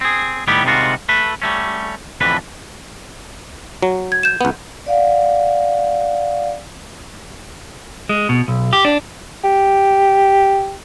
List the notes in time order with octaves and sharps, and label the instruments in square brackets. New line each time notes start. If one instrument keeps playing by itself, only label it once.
[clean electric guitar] C4 G#4
A2 D#3 G3 B3 E4 G4
C3 D#3 G3 G#3 F4 F#4
A3 A4 B4
G3 A3 C#4
F2 A2 D3 E3 B4
[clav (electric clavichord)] F#3
[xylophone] G#6
G6 E7
[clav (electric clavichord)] C#2 B3
[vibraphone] D5 F5 F#5
[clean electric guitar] G#3
B2
B1
G4
D4
[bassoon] G4